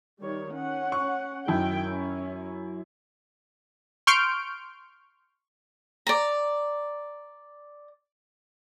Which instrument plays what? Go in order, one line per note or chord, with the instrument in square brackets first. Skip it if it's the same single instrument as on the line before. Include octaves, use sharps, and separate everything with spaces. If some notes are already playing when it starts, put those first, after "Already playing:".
[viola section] D#3 G3 C#5
C#4 F#5
[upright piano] C#6
[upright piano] F#2 E4 [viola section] D#3 G5
[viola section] C#4
[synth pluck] C6 C#6 F6 G6 D7
[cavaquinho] D5 A#5